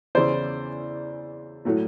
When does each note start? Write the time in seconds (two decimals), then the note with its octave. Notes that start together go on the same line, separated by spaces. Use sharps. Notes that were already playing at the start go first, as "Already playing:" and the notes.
0.15 E2 C#3 E3 C5 D5
1.65 A2 F#3 A3